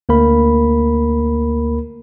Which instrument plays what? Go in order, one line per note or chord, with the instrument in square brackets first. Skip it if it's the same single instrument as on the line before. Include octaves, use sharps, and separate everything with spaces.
[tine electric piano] D2 A#3 A#4 B5